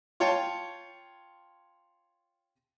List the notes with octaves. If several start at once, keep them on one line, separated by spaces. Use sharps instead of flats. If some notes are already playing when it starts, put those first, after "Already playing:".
F4 C#5 G5 A5